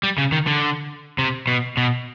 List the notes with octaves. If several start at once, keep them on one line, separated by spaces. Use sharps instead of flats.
G3
C#3
D#3
D3
C3
B2
B2